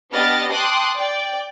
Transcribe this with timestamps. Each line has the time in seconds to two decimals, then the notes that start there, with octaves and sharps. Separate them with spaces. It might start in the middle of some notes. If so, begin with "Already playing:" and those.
0.12 B3 D4 G4 D#5 F6 A6
0.50 G5 A5 C6 D6 D#6 F#6
0.96 D5 G5